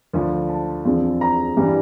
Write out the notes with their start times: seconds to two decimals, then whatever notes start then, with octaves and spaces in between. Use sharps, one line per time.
0.14 D2 D3 F3
0.49 A5
0.85 E2 D3 F3 C4
1.21 A#5
1.57 G2 E3 G3 D4